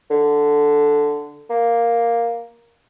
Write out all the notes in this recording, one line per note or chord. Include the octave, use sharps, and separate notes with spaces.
D3
A#3